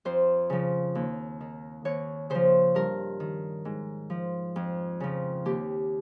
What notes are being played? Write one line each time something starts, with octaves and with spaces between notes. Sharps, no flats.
F2 C5
C#3 F3
D#2
D#3
D#2 C#5
C#3 F3 C5
G2 A#4
D#3
G#2
F3
F2
C#3 F3
D#2 G4